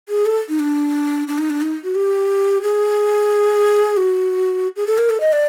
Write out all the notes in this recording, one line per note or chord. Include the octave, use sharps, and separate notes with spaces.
G#4
A4
D#4
D4
D4
D#4
D4
D#4
F#4
G4
G#4
F#4
G#4
A4
A#4
A4
D#5
D5